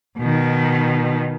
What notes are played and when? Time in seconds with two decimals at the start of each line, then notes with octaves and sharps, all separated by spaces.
0.19 B2 D#3